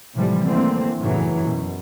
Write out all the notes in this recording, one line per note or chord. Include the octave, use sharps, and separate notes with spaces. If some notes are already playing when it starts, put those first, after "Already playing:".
A2 C3 E3 F3 G3
D3 E3 A3 A#3 C4
G1 F#2 A2 C#3 E3 F#3
F#2 B2